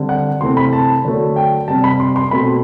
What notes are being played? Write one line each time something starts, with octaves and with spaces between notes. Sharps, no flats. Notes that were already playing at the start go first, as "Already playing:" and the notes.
Already playing: D3 G3 C4
F#5
C3 E3 A3 C4 C6
B5
A5
D3 F#3 A3
G5
C3 G3 C4 A5
B5
C6
C6
B2 A3 C4 B5